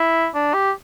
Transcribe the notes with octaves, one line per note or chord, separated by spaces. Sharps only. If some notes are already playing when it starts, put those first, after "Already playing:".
Already playing: E4
D4
G4